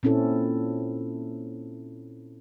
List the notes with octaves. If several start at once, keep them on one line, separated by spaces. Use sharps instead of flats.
A#2 C4 C#4 E4 A4